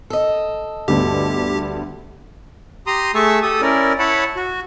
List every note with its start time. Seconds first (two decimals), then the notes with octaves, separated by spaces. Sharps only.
0.10 A4 D#5
0.88 D2 G2 B3 G4
2.87 G4 A#5 C6 D#6
3.15 A3 G#4 E5 A5 C#6 E6
3.42 G4 A4 D#6
3.62 C#4 E4 A#4 D5
3.99 E4 C#5 F#5 A5 B5
4.36 F#4